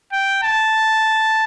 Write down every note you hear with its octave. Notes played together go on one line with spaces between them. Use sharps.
G5
A5